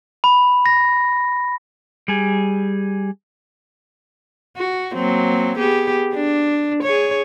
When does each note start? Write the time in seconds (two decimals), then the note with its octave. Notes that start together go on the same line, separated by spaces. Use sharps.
0.24 B5
0.66 A#6
2.08 G3 G#4
4.56 F#4
4.94 F#3 A#3 C4
5.58 B3 G4 G#4
6.14 D4
6.83 G#4 C#5